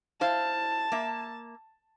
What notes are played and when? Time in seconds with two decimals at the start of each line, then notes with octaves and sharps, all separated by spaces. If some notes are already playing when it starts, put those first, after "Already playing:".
0.21 E4 C5 F5 A5
0.92 A#3 E5